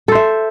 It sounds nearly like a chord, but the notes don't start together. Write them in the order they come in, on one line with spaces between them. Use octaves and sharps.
A4 C5 E5